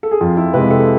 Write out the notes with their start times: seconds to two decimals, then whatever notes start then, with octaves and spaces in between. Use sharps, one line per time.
0.03 A4
0.11 G#4
0.21 F2 F4
0.37 E4
0.54 C3 G#3 B4
0.71 A4